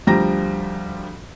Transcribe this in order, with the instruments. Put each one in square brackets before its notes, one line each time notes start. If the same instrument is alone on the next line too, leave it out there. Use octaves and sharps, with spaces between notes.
[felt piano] D2 F3 G3 G4 A#5 A#6